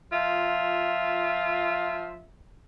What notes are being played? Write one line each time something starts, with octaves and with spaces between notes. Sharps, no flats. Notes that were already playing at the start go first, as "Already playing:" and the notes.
F3 F4 E5